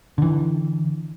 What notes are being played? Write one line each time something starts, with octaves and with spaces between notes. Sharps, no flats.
D3 E3